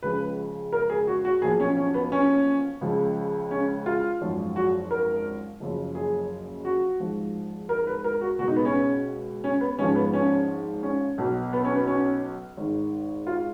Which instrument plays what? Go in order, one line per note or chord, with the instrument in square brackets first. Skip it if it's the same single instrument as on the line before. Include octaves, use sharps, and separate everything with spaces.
[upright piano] C#2 C#3 F3 B4
A#4
G#4
F#4
F#4
B1 A#2 F3 G#4
C#4
C#4
B3
C#4
C#2 C#3 F3
C#4
F4
G#1 F#2 F3
F#4
A#4
F#1 F#2 C#3 F3
G#4
F#4
G#1 G#2 F3
A#4
B4
A#4
F#4
C#2 B2 F#4
D#4
B3
C#4
C#4
B3
G#1 G#2 F3 C#4
B3
C#4
C#4
B1 B2
B3
C#4
B3
C#4
G#1 G#2 D#3
F4